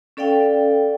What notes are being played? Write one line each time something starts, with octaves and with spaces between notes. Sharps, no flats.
C#4 A4 D5 F5 G5